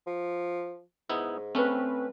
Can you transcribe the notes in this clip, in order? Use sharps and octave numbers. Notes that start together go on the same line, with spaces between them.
F3
G#2 B3 D#4 E4
A3 C4 C#4 B4